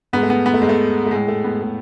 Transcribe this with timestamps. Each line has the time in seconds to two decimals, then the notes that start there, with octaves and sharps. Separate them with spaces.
0.13 G#2 G#3 B3
0.23 A3
0.30 B3
0.46 B3
0.54 A3
0.62 G#2 G#3
0.69 A3
1.06 A3
1.11 A2 G#3
1.28 A3
1.44 B3
1.61 A2 G#3